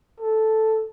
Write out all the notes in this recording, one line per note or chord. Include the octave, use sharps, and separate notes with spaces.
A4